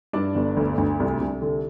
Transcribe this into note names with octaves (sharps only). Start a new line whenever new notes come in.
G2 D4 D5
G1
D2
D2
C2
C2
D3